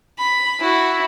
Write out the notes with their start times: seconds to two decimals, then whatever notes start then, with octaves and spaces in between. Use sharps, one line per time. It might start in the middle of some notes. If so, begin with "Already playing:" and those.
0.19 B5
0.60 E4 F#4